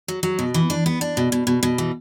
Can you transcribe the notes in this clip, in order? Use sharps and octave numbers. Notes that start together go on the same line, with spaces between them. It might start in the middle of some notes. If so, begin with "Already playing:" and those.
F#3
F#3
B2
E3
D4
B3
D4
B2
B2
B2
B2
E3